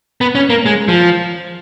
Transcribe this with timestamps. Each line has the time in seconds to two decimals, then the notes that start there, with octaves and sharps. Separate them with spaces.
0.21 B3
0.35 C#4
0.50 A#3
0.66 G#3
0.88 F3